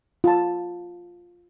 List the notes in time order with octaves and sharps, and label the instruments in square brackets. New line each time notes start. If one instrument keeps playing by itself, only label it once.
[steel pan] F4 A5